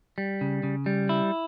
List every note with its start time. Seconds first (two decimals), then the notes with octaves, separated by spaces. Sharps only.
0.18 G3
0.41 C#3
0.63 C#3
0.86 G3
1.09 E4